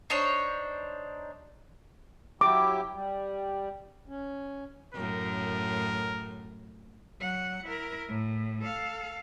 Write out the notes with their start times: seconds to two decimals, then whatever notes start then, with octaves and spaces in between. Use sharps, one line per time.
0.10 D4 D#4 C5 C#5
2.41 F#3 E4 G4 D6
2.93 G3
4.08 C#4
4.94 F#2 A2 A#4
7.20 F#3 F#5
7.65 E4 A#4
8.08 A2
8.61 A4 F5